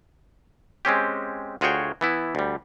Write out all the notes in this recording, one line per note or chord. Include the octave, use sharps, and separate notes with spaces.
G#3 C4 C#4 G4
D2 F4 F#4 G#4 C#5 G5
E3 B3 E4
D2 G3